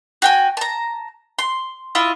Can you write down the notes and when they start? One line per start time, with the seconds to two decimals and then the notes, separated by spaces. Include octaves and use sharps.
0.22 F#4 G5 G#5
0.57 A5 A#5
1.39 C6
1.95 E4 F4 D#5